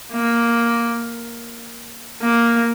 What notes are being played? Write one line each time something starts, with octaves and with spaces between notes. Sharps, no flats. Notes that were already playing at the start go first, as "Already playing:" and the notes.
A#3
A#3